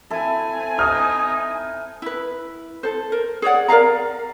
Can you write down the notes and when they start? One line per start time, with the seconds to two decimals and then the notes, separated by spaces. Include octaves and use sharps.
0.10 C4 E4 A4 G#5
0.79 D#4 D#6 F6
2.02 E4 B4
2.83 A4 C5
3.12 A#4
3.42 G#4 C#5 D5 F#5
3.68 A#4 D5 F5 A#5